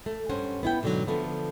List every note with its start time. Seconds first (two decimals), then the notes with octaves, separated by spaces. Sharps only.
0.06 A3
0.29 G2 C#4 C5 F#5
0.63 B3 E4 G5
0.83 G#2 B2 D3 F3 F#3
1.07 D3 F3 A3 B3